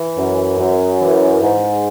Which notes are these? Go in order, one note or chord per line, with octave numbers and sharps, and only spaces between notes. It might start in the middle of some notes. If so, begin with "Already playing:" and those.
Already playing: E3
F#2
F#2
E3
G#2